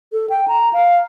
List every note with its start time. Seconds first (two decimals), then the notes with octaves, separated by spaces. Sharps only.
0.13 A4
0.30 G5
0.48 A#5
0.73 F5